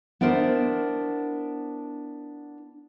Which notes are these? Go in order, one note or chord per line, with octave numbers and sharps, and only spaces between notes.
B3 D4 E4 A#4 C5